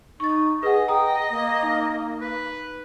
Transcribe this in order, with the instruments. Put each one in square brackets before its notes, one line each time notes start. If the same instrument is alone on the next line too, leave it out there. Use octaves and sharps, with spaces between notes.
[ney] D#4 [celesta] C#6 A6
[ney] G#4 [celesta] B4 F#5 [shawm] D#5
[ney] G5 [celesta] A#5 D#6
[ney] A#3
[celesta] D#4
[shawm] B4